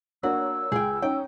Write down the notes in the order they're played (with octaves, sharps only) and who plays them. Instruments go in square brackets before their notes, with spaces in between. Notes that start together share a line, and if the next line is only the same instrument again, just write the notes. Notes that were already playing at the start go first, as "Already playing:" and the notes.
[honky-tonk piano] A#3 D4 C#5 [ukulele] F#4 [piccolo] E6
[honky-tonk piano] C#2 [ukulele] G#4 G5
[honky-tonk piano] C#4 D#4 [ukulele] G5